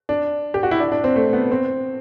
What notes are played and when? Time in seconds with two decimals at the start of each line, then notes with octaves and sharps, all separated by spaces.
0.09 D4
0.54 G4
0.63 F#4
0.71 E4
0.80 D4
0.92 D4
1.04 C4
1.16 A3
1.33 B3
1.51 C4